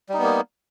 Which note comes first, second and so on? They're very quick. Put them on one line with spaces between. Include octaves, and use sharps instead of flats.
G3 D#4 B3 A#3